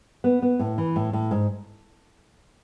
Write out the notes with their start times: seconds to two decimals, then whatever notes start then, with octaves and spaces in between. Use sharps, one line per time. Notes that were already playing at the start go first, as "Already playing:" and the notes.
0.24 B3
0.42 B3
0.59 A2
0.78 E3
0.96 A2
1.13 A2
1.31 G#2